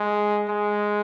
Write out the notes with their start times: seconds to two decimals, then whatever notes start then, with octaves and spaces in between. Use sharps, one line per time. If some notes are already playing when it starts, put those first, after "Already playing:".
Already playing: G#3
0.49 G#3